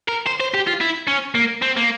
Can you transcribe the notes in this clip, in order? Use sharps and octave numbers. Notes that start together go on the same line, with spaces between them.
A#4
C5
C5
G4
F4
E4
C#4
A#3
C4
A#3